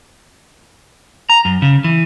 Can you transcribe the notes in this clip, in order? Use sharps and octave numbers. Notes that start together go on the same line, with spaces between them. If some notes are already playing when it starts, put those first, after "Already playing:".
A#5
F#2
C#3
E3